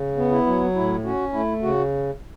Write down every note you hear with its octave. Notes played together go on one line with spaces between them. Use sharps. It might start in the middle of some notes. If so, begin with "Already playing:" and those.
Already playing: C#3
B3
E4
F#3
A2 E4
C#4 F#4
A3 E4
C#3 F#4